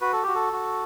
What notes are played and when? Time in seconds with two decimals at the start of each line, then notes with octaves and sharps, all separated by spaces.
0.01 F#4 B4
0.13 A4
0.23 F#4 G4
0.35 A4
0.53 F#4